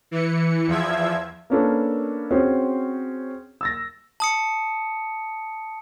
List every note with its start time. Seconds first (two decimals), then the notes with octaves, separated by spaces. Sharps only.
0.11 E3 C#7
0.67 E2 F3 E5 G#6
1.50 A#3 B3 C#4 D4 A4 A#4
2.31 C4 C#4 F#4 G#4 C5
3.61 E6 A6 A#6
4.20 A5 D#6 C#7